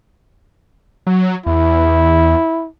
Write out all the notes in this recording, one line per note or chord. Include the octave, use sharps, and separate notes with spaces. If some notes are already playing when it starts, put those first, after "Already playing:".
F#3
E2 E4